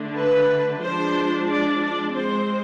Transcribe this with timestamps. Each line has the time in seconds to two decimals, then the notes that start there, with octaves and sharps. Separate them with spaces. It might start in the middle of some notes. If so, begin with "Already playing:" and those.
Already playing: D3 A3 D4
0.17 B4
0.82 F3 G#3 D4 C5
1.49 D5
1.82 D5
2.14 G#3 C4 C5